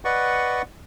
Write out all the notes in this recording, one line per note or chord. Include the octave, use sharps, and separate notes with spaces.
B4 D5 D#5 F#5 C#6